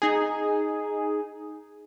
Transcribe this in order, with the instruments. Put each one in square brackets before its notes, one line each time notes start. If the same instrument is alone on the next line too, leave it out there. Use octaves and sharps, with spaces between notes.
[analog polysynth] D#4 G#4